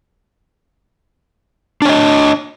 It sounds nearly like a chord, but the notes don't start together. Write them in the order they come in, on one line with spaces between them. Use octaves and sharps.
D4 C#5 D#5